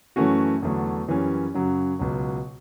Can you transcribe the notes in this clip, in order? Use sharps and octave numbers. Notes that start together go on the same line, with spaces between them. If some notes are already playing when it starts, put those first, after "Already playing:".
F#2 E3 A3 C#4 F#4
E2 D3 F#3 A3
F#2 E3 G3 C#4
F#2 C#3 F#3
C#2 B2 F#3